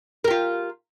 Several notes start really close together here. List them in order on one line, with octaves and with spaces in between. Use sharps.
A#4 G4 F4